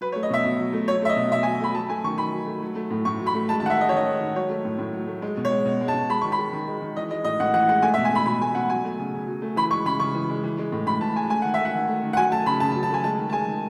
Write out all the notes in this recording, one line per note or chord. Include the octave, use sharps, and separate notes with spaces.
F#3 B4
C#5
A3
D#5
B2 E5
B2
F#3
A3
F#3 C#5
A3 E5
D#5
B2
B2 E5
G#5
F#3
A3 B5
F#3 A5
A3 G#5
D#3 C#6
D#3 B5
F#3
A3
F#3
A3
A2
A2 C#6
F#3
B5
A3
G#3 A5
A5
D#3 F#5
E5
G#3 D#5
C#5
D#3 D#5
G#3
D#3
F#3 C#5
A3
A2
A2
F#3
A3
G#3
B2
C#5
G#3
B2
G#3
A5
B2
G#3 B5
D#3 C#6
B5
G#3
D#3
G#3
D#3
E3 D#5
G#3 D#5
A2 D#5
A2 F#5
E3 F#5
G#3 F#5
A3 G#5
E5
B2
G#5
A3 B5
B2 B5
A3 G#5
B2 F#5
F#3 G#5
A3
C#3
C#3
F#3
A3
E3 B5
G#3 C#6
C#3 B5
C#3 C#6
E3
G#3
E3
G#3
A2
A2 B5
E3 A5
G#3 G#5
A3 G#5
D#3 F#5
E5
A3
F#5
D#3
A3
D#3
F#5
F#3 G#5
A3 A5
C#3 B5
C#3 A5
A5
F#3
A5
A3 G#5
G#3 A5
D#3
A5
G#3 G#5
D#3